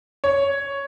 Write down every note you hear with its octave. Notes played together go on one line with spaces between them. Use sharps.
C#5